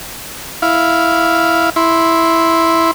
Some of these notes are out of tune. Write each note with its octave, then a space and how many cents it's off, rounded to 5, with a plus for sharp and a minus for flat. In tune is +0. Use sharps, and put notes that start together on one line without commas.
E4 +0 F5 +0
E4 +0 C6 +0